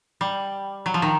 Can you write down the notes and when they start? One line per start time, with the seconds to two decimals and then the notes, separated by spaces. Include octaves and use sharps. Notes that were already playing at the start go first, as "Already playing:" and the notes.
0.21 G3
0.86 F#3
0.94 F3
1.02 D#3